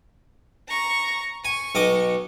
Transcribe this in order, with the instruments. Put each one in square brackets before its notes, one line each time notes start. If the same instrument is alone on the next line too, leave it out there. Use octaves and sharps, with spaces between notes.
[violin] A#5 C#6
[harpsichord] G#5 [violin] C#6
[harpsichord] B1 D#5 D6